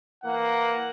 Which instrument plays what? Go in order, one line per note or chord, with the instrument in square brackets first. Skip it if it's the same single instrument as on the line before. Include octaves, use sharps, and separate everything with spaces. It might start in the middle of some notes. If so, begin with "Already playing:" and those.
[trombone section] E3 A#3 [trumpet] F#5